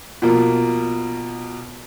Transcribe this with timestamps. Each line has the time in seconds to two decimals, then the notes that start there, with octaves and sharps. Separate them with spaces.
0.22 B2 F3 A#3